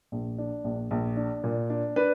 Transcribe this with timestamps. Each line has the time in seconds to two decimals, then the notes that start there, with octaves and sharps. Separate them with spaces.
0.12 A#1
0.38 D4
0.64 A#1
0.91 A#1
1.17 D4
1.44 A#2
1.70 D4
1.96 D4 B4